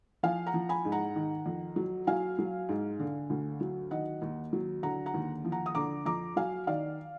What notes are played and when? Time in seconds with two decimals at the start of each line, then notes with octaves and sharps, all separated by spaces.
0.23 F3 F5 G#5
0.46 F#5 A#5
0.54 F3
0.69 G#5 B5
0.85 G#2
0.92 F#5 A#5
1.16 D#3
1.46 F2
1.76 F#3
2.07 F#3 F5 G#5
2.39 F#3
2.69 G#2
2.99 D3
3.30 D2
3.61 F#3
3.91 D#3 D#5 F#5
4.22 D#2
4.53 F#3
4.83 D3 F#5 A#5
5.06 F#5 A#5
5.14 D#2
5.45 F3
5.52 F#5 A#5
5.66 D#6
5.75 D3 A#5 D6
6.06 F2 A#5 D6
6.36 F#3 F5 G#5
6.67 D#3 D5 F5